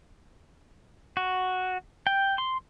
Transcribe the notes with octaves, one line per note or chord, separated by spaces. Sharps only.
F#4
G5
C6